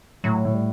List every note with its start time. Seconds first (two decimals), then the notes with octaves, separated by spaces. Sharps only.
0.24 A2 F#3
0.45 A2
0.54 G3